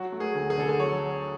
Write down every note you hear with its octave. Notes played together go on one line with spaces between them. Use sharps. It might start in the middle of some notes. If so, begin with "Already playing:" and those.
Already playing: F#3 F#4
A3
G#4
D2
G#4
D3 A4
G#4
F#3 C#5